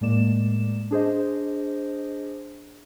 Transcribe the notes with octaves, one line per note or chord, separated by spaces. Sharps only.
A2 G#3 A#3 D5 E7
D4 G#4 C5 D#5